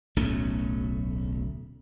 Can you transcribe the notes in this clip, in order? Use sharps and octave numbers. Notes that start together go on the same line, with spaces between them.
D1 B1 A3 C#4